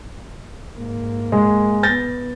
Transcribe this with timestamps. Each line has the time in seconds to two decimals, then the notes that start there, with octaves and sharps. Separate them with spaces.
0.74 G#2 A#3
1.32 G#3
1.83 B3 G6 A6 A#6